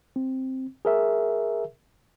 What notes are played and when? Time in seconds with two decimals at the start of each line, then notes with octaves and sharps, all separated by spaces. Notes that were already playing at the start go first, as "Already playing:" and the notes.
0.16 C4
0.85 G#4 A#4 E5